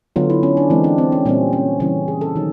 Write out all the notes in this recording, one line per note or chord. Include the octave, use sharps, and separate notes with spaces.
D3 F#3 B3 F4
E4
C#4
D4
E3 G#3 C4
D4
C4
C#4
A#2 G3 C4 C#4
C#4
C#3 E3 G3 C#4
G#4
A4
D#3 F#3